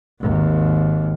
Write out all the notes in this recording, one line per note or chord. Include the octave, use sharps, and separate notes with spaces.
G#1 D#2